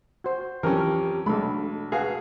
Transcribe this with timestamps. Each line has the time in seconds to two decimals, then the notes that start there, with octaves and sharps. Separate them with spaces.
0.24 F#4 C5
0.63 F2 E3 F#3 C#4 G4 A#4 B4
1.26 B1 G#3 A3 D4 A4 B5
1.92 F#4 G#4 B4 F5